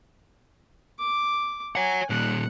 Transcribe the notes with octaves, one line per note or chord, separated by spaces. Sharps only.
D6
C#5 F#5 G#5
A#2 G3 F#5